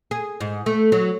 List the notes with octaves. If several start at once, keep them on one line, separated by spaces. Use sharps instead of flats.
G#4
G#2
A3
F#3